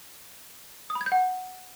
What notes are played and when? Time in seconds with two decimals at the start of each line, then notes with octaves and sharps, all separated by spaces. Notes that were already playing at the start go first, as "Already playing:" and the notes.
0.90 D#6
0.95 B5
1.01 G#6
1.06 G6
1.12 F#5